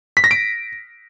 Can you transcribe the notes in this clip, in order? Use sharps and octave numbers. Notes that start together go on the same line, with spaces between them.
B6
A#6
D7